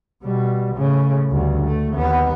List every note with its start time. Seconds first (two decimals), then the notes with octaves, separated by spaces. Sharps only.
0.23 B2 G3
0.75 A2 C#3
1.30 D2 G2
1.66 A3
1.95 D#2 B3